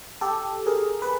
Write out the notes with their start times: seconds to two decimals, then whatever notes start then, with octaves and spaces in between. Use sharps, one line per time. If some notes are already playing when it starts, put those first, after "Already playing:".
0.21 G4 A4
0.66 G#4 A#4
1.02 B4